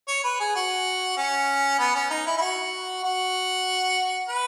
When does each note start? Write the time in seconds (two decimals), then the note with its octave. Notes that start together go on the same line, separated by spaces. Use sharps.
0.08 C#5
0.24 B4
0.40 G#4
0.56 F#4
1.17 C#4
1.79 B3
1.95 C#4
2.10 D#4
2.26 E4
2.38 E4
2.41 F#4
3.04 F#4
4.28 B4